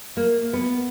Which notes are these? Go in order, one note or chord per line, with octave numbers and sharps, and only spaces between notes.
A#3
B3